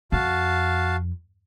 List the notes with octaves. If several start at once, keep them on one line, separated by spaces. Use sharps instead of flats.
F2 F#4 F5 A5